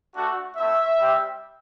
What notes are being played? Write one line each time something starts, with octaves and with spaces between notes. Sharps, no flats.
A3 D4 F#4
A3 C4 E4 E5
G3 C4 G4